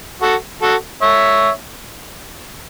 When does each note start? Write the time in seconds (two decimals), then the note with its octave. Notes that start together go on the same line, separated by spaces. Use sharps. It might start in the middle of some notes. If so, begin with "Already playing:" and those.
0.22 F#4 A4
0.62 F#4 A4
1.02 C#5 E5